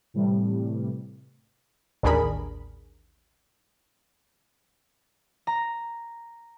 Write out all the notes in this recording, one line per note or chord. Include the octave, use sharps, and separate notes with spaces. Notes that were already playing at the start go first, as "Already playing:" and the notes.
A2 C3 E3 G3
A1 D#2 D4 G#4 A#4 B5
A#5